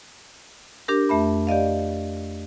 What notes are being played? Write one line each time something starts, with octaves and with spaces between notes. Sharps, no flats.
D4 G4 A#4
F2 A3 E5 B5
G4 D5 D#5 F5